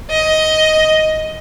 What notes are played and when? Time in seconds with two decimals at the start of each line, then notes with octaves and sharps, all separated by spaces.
0.10 D#5